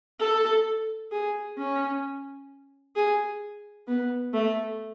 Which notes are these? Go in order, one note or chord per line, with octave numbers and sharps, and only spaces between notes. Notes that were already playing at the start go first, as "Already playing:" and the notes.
A4
G#4
C#4
G#4
B3
A3